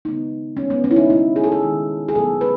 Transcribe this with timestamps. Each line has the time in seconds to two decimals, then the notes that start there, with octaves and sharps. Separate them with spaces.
0.05 C#3 G#3 B3 D#4
0.57 D#3 G#3 B3 C#4
0.70 B3
0.84 C#4
0.91 E4
0.96 D#4
1.10 B2 G#3 B3 E4
1.36 G#4
1.44 A4
1.52 G#4
1.63 D#3 G#3 B3
2.08 G#4
2.15 B2 F#3 B3 A4
2.41 B4